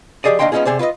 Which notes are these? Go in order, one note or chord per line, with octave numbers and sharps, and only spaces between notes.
F3 B3 G4 G#4 D5 D#5
D#2 D4 D#5 F5 G5 C6
G#3 B3 C#4 D#4 F4 G#4
C3 G#4 C5 D5
F4 B4 D5 D#5